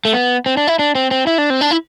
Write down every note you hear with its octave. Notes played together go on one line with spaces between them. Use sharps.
A3
B3
C4
D4
E4
D4
C4
C4
E4
D4
C4
D4
E4